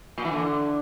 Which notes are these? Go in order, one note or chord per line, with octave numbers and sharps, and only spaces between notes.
A#2
E3
D3